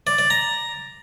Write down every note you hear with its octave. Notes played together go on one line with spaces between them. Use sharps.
D5
D5
A#5